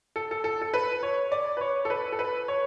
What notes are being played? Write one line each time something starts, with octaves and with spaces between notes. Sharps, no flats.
A4
A4
A4
A4
B4
C#5
D5
B4
C#5
A4
B4
A4
B4
C#5